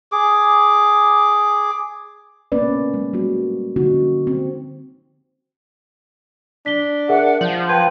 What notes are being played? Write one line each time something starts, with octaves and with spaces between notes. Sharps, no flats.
G#4 D6
A#3 B3 C#4 B4 D5
G#3
G3 A#3 F#4
D3 F3 A#3 C#4 D#4 F#4
C4
D4 B6 G7
G#4 A#4 E5 F#5
F3 G6 F#7
B4 G5 C6 G#6